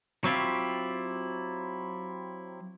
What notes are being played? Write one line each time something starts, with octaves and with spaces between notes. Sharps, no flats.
F#3 C4 E4 F4 G4